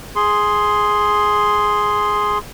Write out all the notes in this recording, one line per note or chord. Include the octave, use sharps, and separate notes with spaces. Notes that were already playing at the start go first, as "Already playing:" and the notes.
G#4 C6